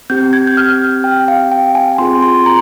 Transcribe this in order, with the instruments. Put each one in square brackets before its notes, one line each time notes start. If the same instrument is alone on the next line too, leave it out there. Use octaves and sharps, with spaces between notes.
[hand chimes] C4 G4 G6
G#6
G6
F6
G5
F5
G5
G#5
C4 F4 G#4 C6
C6
A#5